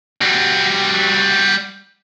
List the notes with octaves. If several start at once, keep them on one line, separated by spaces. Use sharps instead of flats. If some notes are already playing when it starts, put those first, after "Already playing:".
G3 F#4